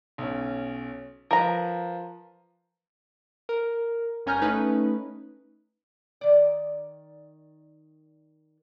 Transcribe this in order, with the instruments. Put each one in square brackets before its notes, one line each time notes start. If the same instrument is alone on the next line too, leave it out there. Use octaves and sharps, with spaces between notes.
[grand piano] B1 C#4
[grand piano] F3 B4 [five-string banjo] A#4 A#5
[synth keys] A#4
G1 C#4 G#5 A#5 F6 G6
A3 C#4 D#4 B4
[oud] D#3 D5